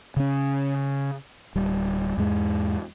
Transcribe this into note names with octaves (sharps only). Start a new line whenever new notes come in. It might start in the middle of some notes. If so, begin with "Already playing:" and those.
C#3 C#4
D1 G3
E2 G#2 G#3